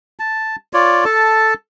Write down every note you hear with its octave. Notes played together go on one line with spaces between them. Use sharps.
A5
F4 C#5 D5
A4 A5